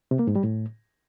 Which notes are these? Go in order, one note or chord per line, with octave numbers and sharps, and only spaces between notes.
C3
A#3
G#2
G3
A2